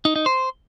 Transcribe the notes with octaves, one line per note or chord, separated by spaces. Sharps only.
D#4
D#4
C5